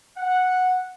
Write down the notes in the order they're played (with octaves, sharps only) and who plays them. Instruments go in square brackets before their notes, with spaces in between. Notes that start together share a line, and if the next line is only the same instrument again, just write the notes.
[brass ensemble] F#5